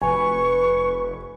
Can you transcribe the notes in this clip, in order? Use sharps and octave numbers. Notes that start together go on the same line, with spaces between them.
F1 B4 G#5 C#6